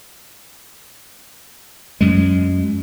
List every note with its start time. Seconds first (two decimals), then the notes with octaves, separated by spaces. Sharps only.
2.01 F#2 G#3